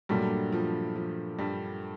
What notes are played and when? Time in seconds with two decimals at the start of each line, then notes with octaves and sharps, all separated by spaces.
0.09 G2 A#2 F#3 G3 A3 D4
0.52 F3
0.96 F3
1.39 G2 G3